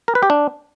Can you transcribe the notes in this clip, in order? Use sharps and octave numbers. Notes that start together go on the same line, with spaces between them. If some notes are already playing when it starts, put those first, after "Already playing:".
A#4
B4
G4
D4